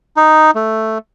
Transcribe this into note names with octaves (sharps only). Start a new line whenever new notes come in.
D#4
A3